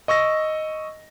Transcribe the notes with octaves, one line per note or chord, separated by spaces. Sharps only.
D#5 C#6 E6 A#6